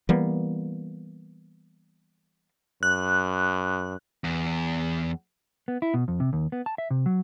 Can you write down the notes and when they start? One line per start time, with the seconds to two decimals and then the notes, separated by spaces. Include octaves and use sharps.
0.09 E3 G3 A#3 B3
2.83 F#2 F#6
4.24 E2
5.68 B3
5.82 E4
5.94 B2
6.08 F2
6.20 C3
6.33 D#2
6.52 B3
6.66 A5
6.78 E5
6.90 C3
7.06 F#3